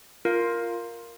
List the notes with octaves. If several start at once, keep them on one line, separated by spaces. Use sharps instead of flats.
F4 A#4 F5